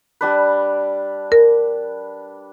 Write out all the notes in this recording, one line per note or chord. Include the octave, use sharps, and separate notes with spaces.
G3 D4 B4
A#4